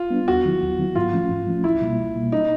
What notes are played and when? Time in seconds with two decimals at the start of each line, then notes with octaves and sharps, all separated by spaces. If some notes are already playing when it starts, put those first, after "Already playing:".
Already playing: F4
0.10 G3 B3 D4
0.28 D#2 F#4
0.45 D#3 F#3 B3 E4
0.62 D#2
0.79 D#3 F#3 B3 E4
0.95 G#2 F4
1.13 F3 A3 C#4
1.30 G#2
1.47 F3 A3 C#4
1.64 C#2 E4
1.81 B2 G3 A#3
1.98 C#2
2.15 B2 G3 A#3
2.32 D#4